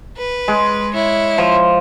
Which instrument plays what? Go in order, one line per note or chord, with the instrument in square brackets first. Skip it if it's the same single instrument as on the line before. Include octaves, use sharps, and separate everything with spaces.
[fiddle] B4
[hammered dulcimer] G#3
[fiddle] E4 C#5
[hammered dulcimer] F3